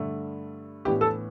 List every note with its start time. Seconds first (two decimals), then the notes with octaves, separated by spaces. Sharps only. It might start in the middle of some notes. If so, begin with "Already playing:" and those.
Already playing: G2 D3 A3
0.85 A2 E3 B3 D4 G4
1.01 A4